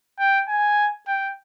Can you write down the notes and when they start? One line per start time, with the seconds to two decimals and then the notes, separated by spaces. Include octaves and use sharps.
0.19 G5
0.48 G#5
1.07 G5